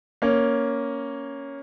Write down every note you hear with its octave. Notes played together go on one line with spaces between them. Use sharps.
A#3 C#4